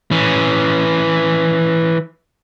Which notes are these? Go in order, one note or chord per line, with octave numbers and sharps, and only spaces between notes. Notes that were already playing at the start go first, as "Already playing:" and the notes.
E3 C#4